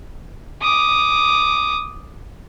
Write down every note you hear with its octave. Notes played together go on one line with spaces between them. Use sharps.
D6 D#6